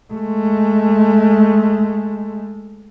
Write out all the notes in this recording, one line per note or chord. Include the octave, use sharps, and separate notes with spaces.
G#3 A3